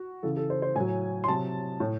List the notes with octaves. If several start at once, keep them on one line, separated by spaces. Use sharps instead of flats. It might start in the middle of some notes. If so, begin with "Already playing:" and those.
Already playing: F#4
C#3 E3 A4
A4
C5
C5
A2 F#3 G#5
C6
C3 F#3 A5
A2